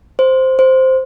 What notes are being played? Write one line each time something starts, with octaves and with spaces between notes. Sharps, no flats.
C5
C5